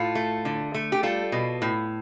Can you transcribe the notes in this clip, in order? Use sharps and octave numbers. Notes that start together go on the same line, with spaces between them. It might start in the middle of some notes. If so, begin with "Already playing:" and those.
Already playing: A2 F4 A4
A3
D3
A3
G4
G3 F4 A4
B2
A2